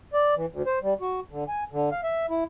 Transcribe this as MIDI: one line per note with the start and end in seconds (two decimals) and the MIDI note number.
0.13 0.34 74
0.36 0.46 52
0.51 0.62 38
0.66 0.79 72
0.83 0.94 55
1.01 1.20 66
1.31 1.44 50
1.48 1.64 80
1.72 1.90 50
1.91 2.01 77
2.03 2.26 76
2.30 2.44 64